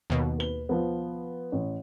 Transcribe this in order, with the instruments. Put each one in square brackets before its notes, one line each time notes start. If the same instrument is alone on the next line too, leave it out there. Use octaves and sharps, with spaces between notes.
[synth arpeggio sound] D#2 B2
[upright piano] B4 G7
F3 B3
A1